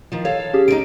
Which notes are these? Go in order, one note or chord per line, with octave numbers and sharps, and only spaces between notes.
D#3 F3
A4 C#5 F5
C#4 G4 G#4
D3 D#4 D7